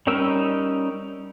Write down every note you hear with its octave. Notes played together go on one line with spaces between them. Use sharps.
G3 C#4 D#4 A#4 E6